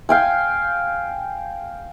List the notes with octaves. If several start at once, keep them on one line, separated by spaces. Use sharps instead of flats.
F5 G5 G#5